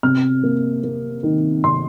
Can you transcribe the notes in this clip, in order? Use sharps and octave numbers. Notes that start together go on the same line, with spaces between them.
C3 F6
A#3
A#3
D#3
C3 C6